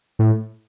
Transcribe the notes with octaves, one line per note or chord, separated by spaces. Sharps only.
A2